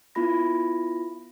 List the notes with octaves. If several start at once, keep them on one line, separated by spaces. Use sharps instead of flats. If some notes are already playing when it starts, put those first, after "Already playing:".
B3 E4 F4 B5 A#6